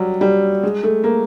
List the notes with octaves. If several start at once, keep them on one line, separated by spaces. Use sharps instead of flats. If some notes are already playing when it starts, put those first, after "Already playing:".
Already playing: F#3 G3
G3
G#3
A3
A#3